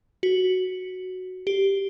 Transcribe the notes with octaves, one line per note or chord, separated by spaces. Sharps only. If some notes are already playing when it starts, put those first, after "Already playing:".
F#4
G4